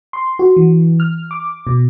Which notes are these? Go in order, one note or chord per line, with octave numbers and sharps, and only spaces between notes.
C6
F#4
E3
F6
D6
B2